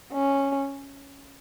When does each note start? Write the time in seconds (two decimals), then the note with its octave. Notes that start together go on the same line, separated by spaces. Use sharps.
0.13 C#4